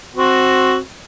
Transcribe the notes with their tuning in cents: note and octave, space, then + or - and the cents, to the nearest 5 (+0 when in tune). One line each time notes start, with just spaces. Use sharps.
C4 +10 F#4 +0